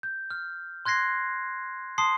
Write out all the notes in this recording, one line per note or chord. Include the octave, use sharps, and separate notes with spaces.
G6
F6
C6 F#6 G#6 A#6 C7
A5 C6 D#6 C7